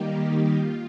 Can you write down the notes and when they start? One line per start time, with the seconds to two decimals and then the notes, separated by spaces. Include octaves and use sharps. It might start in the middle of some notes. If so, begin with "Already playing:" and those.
Already playing: D#3 G3 A#3 D#4 G4
0.57 F4